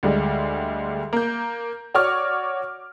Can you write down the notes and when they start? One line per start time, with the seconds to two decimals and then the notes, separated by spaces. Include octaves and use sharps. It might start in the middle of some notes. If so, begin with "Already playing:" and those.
0.03 D2 G3 G#3
1.13 A#3 G6
1.94 F#4 C#5 D5 C#6 D6 F6